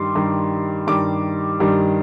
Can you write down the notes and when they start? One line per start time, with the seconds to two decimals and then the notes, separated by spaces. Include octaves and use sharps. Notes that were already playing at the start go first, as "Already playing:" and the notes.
Already playing: G2 D#3 G3 C6 D6
0.15 G2 D#3 G3
0.87 G2 D#3 G3 D6
1.60 G2 D#3 G3